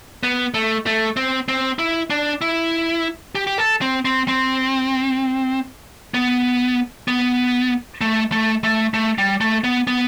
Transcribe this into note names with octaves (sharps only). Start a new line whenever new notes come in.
B3
A3
A3
C4
C4
E4
D4
E4
G4
G4
A4
C4
C4
C4
B3
B3
A3
A3
A3
A3
G3
A3
B3
B3